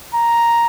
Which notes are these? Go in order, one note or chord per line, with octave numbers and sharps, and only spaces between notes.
A#5